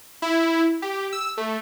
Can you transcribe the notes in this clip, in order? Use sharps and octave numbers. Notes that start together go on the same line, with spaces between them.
E4
G4
E6
A3